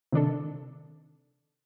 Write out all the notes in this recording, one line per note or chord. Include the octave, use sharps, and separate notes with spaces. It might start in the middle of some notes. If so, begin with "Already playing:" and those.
C3 D#3 D4 A4